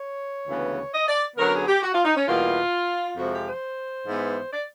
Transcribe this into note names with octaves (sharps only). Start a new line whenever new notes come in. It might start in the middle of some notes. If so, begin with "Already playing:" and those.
Already playing: C#5
D2 C#3 E3 G#3 B3
D#5
D5
F#2 D3 F#3 B3 A#4
G#4
G4
F#4
F4
D#4
C#4
E2 B2 G3 A#3 F4
F2 C3 F3 G#3 F#4
G4
C5
G#2 E3 G#3 B3
D5